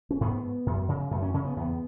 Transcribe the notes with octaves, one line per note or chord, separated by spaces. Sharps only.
C#4
G#2 B3
F#2
C#3
F#2 A3
C#4
C#3 C#4
B3
E2 B3